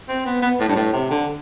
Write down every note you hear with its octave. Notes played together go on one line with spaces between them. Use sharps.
C4
B3
B3
A2
G2
A2
C3
D3